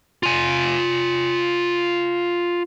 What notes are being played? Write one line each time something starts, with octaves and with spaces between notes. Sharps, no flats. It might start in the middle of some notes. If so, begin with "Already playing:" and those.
F4 G#5